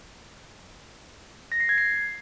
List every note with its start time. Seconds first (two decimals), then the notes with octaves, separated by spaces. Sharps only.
1.52 A#6
1.60 C7
1.69 G#6
1.78 C7